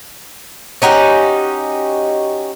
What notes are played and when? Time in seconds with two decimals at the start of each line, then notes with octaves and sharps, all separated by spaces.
0.82 C#4 D#4 F#4 G4